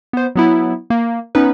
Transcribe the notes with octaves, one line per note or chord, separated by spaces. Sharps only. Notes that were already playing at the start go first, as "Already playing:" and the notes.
B3 C5
F#3 B3 E4
A#3
B3 C#4 D#4 B4